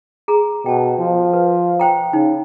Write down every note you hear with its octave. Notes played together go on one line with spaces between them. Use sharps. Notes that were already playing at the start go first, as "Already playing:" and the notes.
G#4 A#5
B2 G5 A5
F3
B4
C5 G5 A#5
C#3 D#4